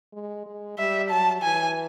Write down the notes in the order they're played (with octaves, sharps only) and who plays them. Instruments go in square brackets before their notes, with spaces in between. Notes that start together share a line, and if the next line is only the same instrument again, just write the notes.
[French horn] G#3
G#3
[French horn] G3 [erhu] E5
[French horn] F#3 [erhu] A5
[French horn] E3 [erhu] G#5